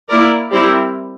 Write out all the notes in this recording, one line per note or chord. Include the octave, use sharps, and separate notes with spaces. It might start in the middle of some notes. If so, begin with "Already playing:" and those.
A#3 E4 A#4 D5
G3 C4 E4 A#4